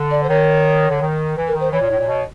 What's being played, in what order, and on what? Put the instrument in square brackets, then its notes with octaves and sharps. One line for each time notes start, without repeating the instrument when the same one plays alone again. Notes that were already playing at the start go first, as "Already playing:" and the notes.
Already playing: [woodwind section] D3
[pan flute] D5
C5
[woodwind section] D#3 [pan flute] C#5
[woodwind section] D3
D#3
E3
[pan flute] A#4
[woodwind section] D#3
[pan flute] C5
[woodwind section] E3 [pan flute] C#5
[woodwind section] A#2
A2
A#2
B2